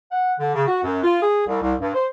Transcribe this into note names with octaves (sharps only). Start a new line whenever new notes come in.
F#5
D3
C#3
F#4
F#2
F4
G#4
C2
C2
G2
C5